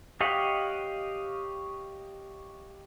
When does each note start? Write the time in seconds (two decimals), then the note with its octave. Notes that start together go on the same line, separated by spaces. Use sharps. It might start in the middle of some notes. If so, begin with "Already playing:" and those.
0.21 G4 C#5 D#5 F5 F#5